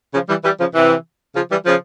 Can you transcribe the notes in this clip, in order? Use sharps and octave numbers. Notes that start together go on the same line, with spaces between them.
C#3 F3
E3 G3
E3 G3
C#3 F3
C3 E3
C#3 F3
E3 G3
C#3 F3